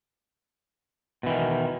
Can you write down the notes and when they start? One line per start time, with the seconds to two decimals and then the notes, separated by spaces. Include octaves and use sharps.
1.23 B2
1.26 E3
1.29 D#3